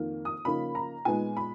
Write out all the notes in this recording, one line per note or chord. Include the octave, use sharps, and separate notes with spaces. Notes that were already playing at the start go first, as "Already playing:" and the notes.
Already playing: F2 D#3 A#3
D#6
C#3 F3 A#3 D#4 B5
A#5
A#2 G#3 B3 D#4 G#5
B5